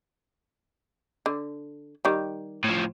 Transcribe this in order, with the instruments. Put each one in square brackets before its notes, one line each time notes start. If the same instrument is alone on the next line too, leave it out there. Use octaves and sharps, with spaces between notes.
[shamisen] D3
D#3 G3
[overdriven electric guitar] A2 F3